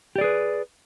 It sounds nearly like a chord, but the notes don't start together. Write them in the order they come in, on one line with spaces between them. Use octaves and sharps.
G4 D5 G#4 B4